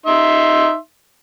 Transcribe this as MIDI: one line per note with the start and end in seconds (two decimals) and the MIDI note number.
0.06 0.75 63
0.06 0.75 76
0.06 0.75 84